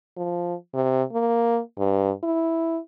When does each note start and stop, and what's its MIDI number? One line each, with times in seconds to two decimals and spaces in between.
0.17 0.54 53
0.74 1.03 48
1.13 1.60 58
1.78 2.12 43
2.23 2.79 64